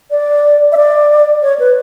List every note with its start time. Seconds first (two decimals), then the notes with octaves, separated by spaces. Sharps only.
0.11 D5
0.72 E5
0.77 D5
1.42 C#5
1.59 B4